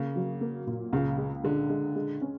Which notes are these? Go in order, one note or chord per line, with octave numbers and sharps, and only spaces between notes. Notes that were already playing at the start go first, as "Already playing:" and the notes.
Already playing: C#3 A#3
F#3
A#3
A#2
C#2 C#3
G#3
D3 G#3
G#3
G#3
C#4